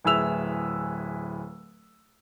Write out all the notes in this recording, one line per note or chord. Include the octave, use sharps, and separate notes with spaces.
D1 E4 G#4 B4 E6 F7